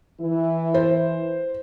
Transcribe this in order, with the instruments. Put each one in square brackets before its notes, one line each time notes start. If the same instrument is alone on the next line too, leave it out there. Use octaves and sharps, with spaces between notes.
[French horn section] E3 E4
[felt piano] C5